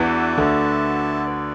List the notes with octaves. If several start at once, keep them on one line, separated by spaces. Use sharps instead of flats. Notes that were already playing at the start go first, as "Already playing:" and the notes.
Already playing: E2 E3 D4 F#4 B4 E5 A5
D2 D3
F#4 B4 D5